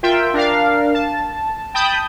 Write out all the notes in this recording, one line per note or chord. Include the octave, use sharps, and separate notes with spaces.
F4 A#4 E5 G5
D4 A#4 F5
A5
G5 A5 B5 D#6 G6